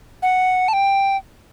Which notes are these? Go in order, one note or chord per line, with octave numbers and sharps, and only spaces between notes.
F#5
A5
G5